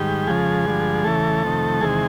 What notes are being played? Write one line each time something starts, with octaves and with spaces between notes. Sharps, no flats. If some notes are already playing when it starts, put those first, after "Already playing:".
Already playing: G#2 D#3 G3 G4
F2 C#3 F3 G#3 G#4
G2 D3 F3
E2 C#3 E3 A3 A4
F2 C3 D#3
E2 C3 D#3 G#3 G#4